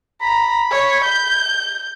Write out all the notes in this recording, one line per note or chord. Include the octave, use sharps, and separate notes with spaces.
A#5 B5
C#5
G6